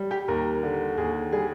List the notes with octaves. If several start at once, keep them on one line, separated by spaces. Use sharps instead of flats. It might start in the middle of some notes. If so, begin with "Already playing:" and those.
Already playing: G3
G4
D#2 A#4
D3
D#2 G#4
G3 G#4